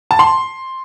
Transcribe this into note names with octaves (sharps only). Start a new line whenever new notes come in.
A5
C6